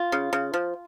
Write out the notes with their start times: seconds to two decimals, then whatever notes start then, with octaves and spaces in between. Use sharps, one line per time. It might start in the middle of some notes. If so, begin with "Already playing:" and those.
Already playing: F4
0.12 C#3
0.33 C#3
0.54 F3